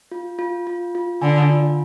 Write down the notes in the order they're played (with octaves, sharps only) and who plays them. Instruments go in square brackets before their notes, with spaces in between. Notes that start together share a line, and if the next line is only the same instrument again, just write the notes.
[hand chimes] F4
F4
F4
F4
[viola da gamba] D3 [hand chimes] G#5
[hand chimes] F4